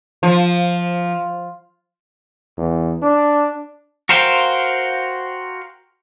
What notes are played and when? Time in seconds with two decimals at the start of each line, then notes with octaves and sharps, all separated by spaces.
0.23 F3
2.58 E2
3.02 D4
4.09 F#4 A#4 C5 F5 G5